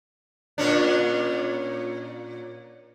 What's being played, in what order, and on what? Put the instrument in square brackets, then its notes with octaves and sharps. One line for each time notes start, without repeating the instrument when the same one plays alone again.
[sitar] A#2 C#4 D4